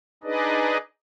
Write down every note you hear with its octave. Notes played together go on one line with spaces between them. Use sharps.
D4 D#4 G#4 B4 D5 D#5